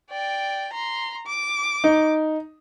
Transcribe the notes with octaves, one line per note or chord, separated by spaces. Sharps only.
D5 G5
A#5 C6
D6
D#4